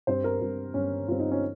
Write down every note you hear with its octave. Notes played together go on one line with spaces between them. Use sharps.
G2 G3 C4 C5
A#4
G2 G3 C4
G2 G3 C4 C#4
G2 G3 C4 F4
D#4
C#4